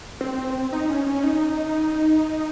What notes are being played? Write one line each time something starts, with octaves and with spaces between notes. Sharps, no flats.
C4
D#4
C#4
C#4
D#4